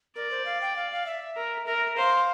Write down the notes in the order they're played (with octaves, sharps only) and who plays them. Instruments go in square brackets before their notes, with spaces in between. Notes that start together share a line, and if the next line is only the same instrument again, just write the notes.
[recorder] A#4 [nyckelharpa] D5
[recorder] C5
F5
G5
F5
F5
E5
[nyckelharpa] A#4
[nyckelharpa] A#4 [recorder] E5
[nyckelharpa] C5 [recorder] F5